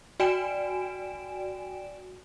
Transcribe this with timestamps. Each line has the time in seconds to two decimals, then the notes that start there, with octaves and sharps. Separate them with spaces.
0.20 F#4 D5 G5 G#5 D7 E7